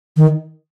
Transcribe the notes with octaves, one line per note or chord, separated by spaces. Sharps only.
D#3